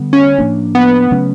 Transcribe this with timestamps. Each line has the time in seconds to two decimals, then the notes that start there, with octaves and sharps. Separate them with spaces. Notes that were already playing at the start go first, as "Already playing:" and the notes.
Already playing: D3 G3 B3
0.13 C#4
0.38 A2 F3 A#3 D4
0.75 B3
1.11 C#3 F#3 A3 C#4